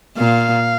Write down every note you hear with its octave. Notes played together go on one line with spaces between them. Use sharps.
A#2 F5